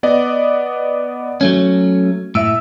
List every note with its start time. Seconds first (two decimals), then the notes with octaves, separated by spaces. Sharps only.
0.03 B3 D5 D#5
1.41 F#3 A3 C#4 G#6
2.35 A2 E5 E6